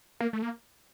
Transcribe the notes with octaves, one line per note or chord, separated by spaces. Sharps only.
A#3
A3
A#3